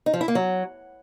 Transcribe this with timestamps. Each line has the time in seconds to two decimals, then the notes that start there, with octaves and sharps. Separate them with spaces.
0.06 D#4
0.13 F3
0.21 E4
0.28 A#3
0.35 F#3